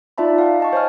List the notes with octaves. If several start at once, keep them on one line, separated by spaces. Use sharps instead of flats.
D#4 F4 D5 E5 A5 B5
F5 F#5
D#5 A5 C#6
C5 C#5 G#5 F6